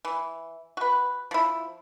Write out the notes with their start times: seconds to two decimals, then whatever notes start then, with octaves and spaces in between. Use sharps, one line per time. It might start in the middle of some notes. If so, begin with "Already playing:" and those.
0.05 E3
0.77 F#4 B4
1.31 F3 E4